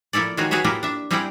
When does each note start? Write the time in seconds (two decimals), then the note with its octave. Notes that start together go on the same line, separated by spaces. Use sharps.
0.13 F3 A#3 E4 A4 D5
0.37 D#3 G#3 F4 F#4 G#4 C#5
0.51 F#4 G#4 B4 C#5 E5
0.64 A#3 E4 F4 G4 B4
0.83 D4 E5
1.11 G3 C4 E4 G#4 F#5 G5